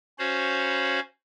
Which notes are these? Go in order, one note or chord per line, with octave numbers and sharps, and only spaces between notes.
C#4 F#4 C5 C#5 F5 B5